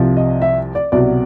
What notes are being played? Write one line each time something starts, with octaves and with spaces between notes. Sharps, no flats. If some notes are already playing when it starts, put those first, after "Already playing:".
Already playing: C2 C3 F3
D#5
E5
D5
C2 B2 F#3 D5